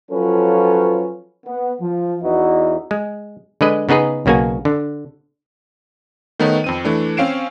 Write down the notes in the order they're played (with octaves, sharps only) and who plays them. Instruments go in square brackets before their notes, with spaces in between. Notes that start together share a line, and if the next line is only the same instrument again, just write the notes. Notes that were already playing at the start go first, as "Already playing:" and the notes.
[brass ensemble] F3 F#3 C#4 F4 A4 B4
B3
F3
E2 D#4 E4 F#4 B4 D#5
[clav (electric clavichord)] G#3
D3 G#3 B4 D#5
C#3 B3 D#4 G#4 B4
B1 C#3 A#3 F#4 G#5
D3
[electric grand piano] D#3 A3 B3 D#4 B4 C#5
F2 C4 D#7
E3 A3 D4
C4 C#4 F5 C7 D7 E7